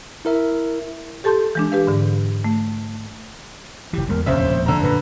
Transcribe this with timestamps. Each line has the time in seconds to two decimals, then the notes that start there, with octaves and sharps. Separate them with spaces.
0.25 E4 A#4 E5
1.24 G4 A4 A5 C6 G6
1.55 E3 G#3 D4
1.72 G4 B4 F5
1.87 G#2 D3
2.44 A3
3.93 F#1 E3 G4
4.09 E2 G#3 B3 A#4
4.26 E1 A#1 D#2 C#3 C5 E5
4.66 D3 A#5
4.82 F#2 A#2 B4